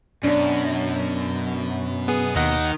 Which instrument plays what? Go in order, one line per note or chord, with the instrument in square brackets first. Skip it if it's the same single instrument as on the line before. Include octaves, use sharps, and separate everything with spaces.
[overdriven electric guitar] F#2 [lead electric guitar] B2 [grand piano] D4 D5
[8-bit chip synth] B3 G#4
[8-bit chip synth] D#2 D#5 F#5 [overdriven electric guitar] D#3